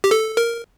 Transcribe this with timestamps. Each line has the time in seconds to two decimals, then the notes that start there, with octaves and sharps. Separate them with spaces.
0.04 G4
0.11 A4
0.37 A#4